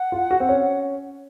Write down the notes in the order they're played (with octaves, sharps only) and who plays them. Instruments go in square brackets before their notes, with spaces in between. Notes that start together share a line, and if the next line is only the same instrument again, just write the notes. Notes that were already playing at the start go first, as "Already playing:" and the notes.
Already playing: [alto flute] F#5
[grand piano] F4
F#4
C4
C#4